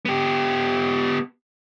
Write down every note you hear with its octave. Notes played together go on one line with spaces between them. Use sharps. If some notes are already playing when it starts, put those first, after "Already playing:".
B3 G4